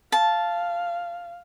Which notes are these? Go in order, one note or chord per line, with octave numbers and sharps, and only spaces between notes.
F5 A5